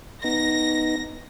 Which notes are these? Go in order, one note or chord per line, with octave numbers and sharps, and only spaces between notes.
B3 D#4 A#6